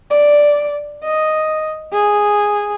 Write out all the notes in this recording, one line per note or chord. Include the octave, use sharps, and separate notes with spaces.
D5
D#5
G#4